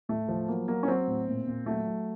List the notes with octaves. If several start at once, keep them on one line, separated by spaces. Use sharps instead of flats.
A2 A3
F3
F#3 A#3
F#3 A#3
C#4
F#3 C4
A2
A#2
A#2
F#3 A3
F#3